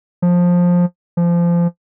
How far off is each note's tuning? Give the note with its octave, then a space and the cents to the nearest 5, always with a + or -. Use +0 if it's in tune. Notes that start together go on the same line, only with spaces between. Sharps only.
F3 +15
F3 -25